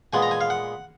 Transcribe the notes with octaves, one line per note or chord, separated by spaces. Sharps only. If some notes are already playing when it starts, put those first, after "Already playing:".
A#2 G#3 B3 G#5
A#5
G#5
F5
F#5